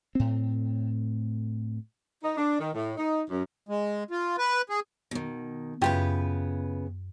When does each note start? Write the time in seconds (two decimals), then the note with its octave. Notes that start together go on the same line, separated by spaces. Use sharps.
0.15 A2 C4
2.23 D#4
2.37 D4
2.59 D#3
2.73 A2
2.97 D#4
3.30 F#2
3.69 G#3
4.11 F4
4.38 B4
4.70 G#4
5.11 B2 D#3
5.82 F#2 C#3 B3 E4 F4 G4 B4